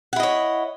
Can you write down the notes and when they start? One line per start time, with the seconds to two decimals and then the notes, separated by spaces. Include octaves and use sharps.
0.13 F#5
0.16 E4
0.20 D#5
0.23 C#5